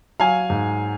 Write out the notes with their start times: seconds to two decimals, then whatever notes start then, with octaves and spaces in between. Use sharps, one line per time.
0.20 F#3 F5 G#5
0.50 G#2